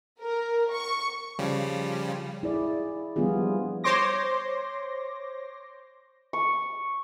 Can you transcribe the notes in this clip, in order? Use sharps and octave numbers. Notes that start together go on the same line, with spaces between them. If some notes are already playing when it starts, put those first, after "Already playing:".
A#4
C#6
C#3 F3 G3
E4 G#4 D5
F3 G3 B3 D4 F4 G#4
C5 C#5 C6 D6 A#6
C#6